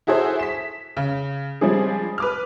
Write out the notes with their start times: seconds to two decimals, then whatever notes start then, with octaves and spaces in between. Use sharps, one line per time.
0.07 E4 F#4 G#4 A4 C5 E5
0.39 B6 E7
0.97 C#3
1.61 F3 G3 G#3 C4 D4 G#4
2.18 B4 D6 F6